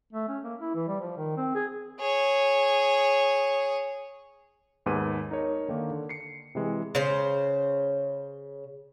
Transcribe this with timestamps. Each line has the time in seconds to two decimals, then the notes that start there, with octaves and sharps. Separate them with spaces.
0.13 A3
0.28 C#4
0.44 A#3
0.61 E4
0.75 E3
0.88 G3
1.00 F3
1.17 D#3
1.37 C4
1.55 G#4
2.00 G#4 C#5
4.86 D#2 G#2 B3 B4 G#5 D#7
5.31 D#4 A#4 C#5
5.68 D3 D#3 A#3
5.91 D3
6.09 C7 C#7
6.55 C3 E3 G#3
6.95 C#3 C5